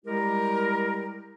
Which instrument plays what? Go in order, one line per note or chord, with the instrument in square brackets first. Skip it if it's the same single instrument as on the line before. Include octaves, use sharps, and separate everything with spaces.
[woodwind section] G3 G#3 E4 G4 A#4